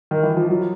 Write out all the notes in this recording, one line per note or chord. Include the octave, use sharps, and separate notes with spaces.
D#3
E3
F3
F#3